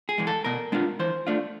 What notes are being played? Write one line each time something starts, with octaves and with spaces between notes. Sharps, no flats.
G#4
E3 G#3
A4
B2 A#4
G#3 B3 D4 F4
E3 C5
A3 D4 F4